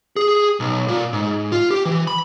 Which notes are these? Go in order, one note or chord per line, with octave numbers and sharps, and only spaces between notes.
G#4
B1
A#2
G#2
F4
G4
E3
B5